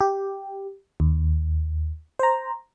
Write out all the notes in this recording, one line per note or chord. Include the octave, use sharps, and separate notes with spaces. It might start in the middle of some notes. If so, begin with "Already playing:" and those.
G4
D#2
C5 A#5